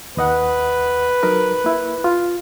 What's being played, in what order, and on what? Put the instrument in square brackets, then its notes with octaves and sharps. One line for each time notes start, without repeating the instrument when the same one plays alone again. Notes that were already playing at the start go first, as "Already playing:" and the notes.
[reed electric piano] D#2 D#5 F#5 [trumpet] B4
[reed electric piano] F#3 D#4 A#4
A#3 E4
F4